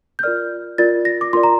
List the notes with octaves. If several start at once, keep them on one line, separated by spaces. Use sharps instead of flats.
G6
F4 A#4 D5 F6
F4 A#4 D5 A6
A#6
D6
F4 A#4 D5 C6
A#5